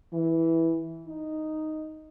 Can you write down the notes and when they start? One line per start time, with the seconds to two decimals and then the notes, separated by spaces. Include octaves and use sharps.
0.13 E3
1.08 D#4